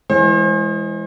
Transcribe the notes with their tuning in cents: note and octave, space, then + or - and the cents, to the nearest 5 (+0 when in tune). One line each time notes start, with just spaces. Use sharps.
E3 +10 G#3 +0 C5 +40